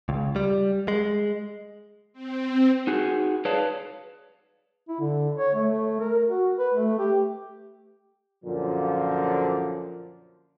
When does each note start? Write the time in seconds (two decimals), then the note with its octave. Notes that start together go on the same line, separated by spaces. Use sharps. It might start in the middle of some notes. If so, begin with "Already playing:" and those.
0.09 C#2
0.36 G3
0.88 G#3
2.13 C4
2.87 D#4 F#4 G#4
3.45 G#4 B4 C#5 D5 F5 A5
4.89 E4
5.00 D3
5.38 C#5
5.55 A3
6.00 A#4
6.29 F#4
6.59 B4
6.74 A3
6.99 G4
8.44 F#2 A#2 D3 F3